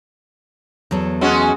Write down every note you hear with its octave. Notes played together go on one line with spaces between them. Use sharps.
E2 F#3 A4
G#3 C#4 F#4